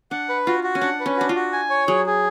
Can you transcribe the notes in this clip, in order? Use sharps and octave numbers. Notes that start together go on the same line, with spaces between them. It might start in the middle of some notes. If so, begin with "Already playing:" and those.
D4 F#5
B4
F4 F#4
F#4
C#4
D4 F#5
B4
C#4
D4 F#4
F4
F#4
G#5
C#5
F#3 G#4
G#4